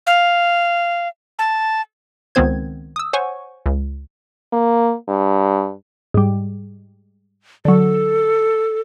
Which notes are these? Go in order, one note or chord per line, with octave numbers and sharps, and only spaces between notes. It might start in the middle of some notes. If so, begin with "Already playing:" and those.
F5
A5
C#2 D#3 B3 C4 C5 G#6
D#6 E6
C5 C#5 F#5 G#5 C#6
C#2
A#3
G2
G#2 G3
D3 F#3 A4